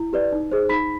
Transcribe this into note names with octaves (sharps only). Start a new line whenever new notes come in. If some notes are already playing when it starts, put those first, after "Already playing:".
Already playing: E4
G4 B4 D5
D#4
G#4 C5
D#4 B5 B6